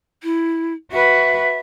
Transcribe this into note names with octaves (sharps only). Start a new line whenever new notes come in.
E4
F#4 B4 E5